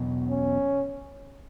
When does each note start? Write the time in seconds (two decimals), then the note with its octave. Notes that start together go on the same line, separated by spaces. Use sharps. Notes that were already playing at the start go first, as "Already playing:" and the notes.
Already playing: E2 B2 F#3
0.30 C#4